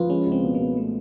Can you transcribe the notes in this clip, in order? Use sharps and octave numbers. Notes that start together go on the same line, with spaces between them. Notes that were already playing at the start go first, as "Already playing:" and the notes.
Already playing: F3 F4 B4
G#3 C#4
C#2
C4
B2
B2 A#3
A3